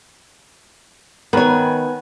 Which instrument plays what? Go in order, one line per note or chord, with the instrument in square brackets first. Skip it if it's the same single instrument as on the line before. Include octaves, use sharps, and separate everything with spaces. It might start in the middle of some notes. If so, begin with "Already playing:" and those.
[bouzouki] D#3 G#5 [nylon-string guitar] B3 C#5 [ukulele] B4 [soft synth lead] B5